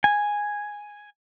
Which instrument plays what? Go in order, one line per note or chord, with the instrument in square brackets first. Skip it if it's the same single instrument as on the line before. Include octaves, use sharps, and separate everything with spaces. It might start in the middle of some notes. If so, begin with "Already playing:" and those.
[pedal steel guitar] G#5